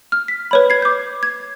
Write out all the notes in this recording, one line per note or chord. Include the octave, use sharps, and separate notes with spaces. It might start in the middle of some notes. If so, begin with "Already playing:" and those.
F6
B6
B4 C#5 B5
G#6 C7
D6 G6
G#6